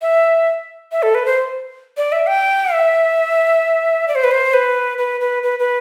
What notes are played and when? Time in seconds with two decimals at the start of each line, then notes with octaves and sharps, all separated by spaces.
0.02 E5
0.92 E5
1.03 A4
1.15 B4
1.26 C5
1.97 D5
2.12 E5
2.27 G5
2.73 E5
4.08 D5
4.15 C5
4.24 B4
4.31 C5
4.54 B4
4.98 B4
5.21 B4
5.43 B4
5.59 B4